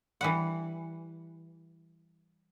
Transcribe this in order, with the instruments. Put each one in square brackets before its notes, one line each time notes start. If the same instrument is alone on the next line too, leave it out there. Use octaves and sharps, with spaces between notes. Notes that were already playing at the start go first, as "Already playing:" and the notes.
[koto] E3 G3 F#5